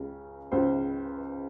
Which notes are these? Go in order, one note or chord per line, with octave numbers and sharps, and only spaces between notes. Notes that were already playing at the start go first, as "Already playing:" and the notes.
Already playing: C#2 C#3
C#2 C#3 C5